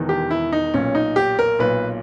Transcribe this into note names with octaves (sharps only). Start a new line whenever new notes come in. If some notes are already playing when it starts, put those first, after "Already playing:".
Already playing: E1 E2 D#3
G4
E4
D#4
B1 A#2 C#4
D#4
G4
A#4
B1 A#2 B4